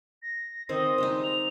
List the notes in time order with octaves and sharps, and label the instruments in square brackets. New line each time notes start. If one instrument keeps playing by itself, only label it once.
[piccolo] A#6
[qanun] D#3 C4 C5 [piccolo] D#5
[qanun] G3 G#3 D#4
[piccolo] F7